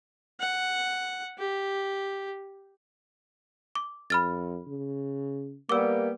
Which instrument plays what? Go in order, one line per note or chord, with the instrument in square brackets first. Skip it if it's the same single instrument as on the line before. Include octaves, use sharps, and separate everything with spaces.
[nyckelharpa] F#5
G4
[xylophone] D6
[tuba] F2 [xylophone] B5 F6 A6
[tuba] C#3
[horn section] G3 B3 [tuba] A#3 [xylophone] D6 E6